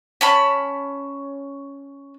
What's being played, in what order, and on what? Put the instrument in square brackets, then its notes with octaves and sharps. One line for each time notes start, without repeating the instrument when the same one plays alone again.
[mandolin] C#4 A5 B5